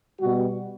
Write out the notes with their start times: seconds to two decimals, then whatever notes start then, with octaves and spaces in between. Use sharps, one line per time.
0.20 B2 G3 F#4